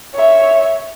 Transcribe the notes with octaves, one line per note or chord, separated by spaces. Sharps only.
C#5 E5